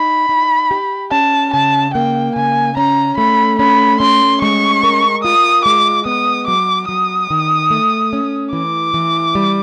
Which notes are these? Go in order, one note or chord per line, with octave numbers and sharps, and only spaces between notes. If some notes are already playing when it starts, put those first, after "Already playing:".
Already playing: D#4 B5
D#4
G4
C#4 A5
C#3 A5
A#3 G5
C#3 G#5
C#4 A#5
A3 B5
C#4 B5
C#4 C6
G#3 C#6
A#4
F4 D#6
G#3 D6
B3 D#6
F#3 D6
F#3 D#6
D#3
A3
C#4
E3 D6
E3
G3